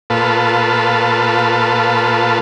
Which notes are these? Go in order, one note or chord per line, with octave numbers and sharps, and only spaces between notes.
A#2 F4 A4 B4